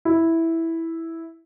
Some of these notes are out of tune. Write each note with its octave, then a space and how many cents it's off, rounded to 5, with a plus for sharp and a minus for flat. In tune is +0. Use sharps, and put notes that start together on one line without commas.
E4 -5